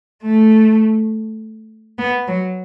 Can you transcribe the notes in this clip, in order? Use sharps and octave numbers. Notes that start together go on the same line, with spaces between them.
A3
B3
F#3